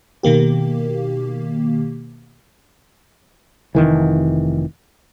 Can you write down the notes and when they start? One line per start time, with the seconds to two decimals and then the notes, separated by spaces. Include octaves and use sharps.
0.23 B2 D#3 A#3 G4
3.75 F1 D2 D#3 E3